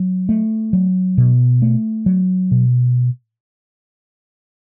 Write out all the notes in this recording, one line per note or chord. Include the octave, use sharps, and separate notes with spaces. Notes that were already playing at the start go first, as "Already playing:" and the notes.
Already playing: F#3
A3
F#3
B2
A3
F#3
B2